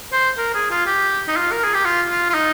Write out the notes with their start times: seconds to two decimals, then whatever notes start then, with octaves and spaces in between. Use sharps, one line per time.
0.13 C5
0.38 A#4
0.54 G#4
0.71 F4
0.86 G4
1.28 D#4
1.37 F4
1.52 A#4
1.64 G#4
1.74 G4
1.85 F4
2.10 F4
2.30 F4
2.34 D#4